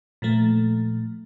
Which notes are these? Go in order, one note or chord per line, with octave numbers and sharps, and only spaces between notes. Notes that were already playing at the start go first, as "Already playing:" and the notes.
A#2 F3 A3